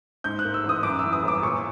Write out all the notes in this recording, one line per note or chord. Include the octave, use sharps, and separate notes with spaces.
G#2 G6
F#6
A#3
E6
A1
D#6
F#2 D6
E3 E6
D#6
G1
D6
A#2 C#6